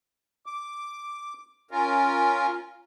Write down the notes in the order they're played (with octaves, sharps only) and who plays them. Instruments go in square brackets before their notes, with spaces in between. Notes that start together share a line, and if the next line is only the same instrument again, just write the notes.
[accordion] D6
C#4 F4 A#4